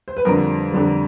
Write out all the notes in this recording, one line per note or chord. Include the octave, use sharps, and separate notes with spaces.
C5
B4
F2 D3 G3 A#4
F2 D3 G3